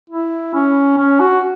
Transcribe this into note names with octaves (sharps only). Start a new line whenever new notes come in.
E4
C#4
C#4
F#4